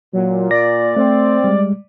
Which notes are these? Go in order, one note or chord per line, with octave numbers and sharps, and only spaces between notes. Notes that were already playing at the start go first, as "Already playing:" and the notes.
A#2 F#3
D5 A#6
A3 C4
G3 G#3